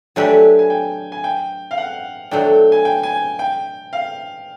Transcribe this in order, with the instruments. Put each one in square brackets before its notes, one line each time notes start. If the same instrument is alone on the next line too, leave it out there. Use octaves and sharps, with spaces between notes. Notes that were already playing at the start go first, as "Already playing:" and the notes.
[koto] F#3 A3 D4 G4 B4 [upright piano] G#5
[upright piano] G#5
G5
G#5
G5
F5
F#5
[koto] B2 F#3 A3 D4 [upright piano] G5
[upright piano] G#5
G5
G#5
G5
F5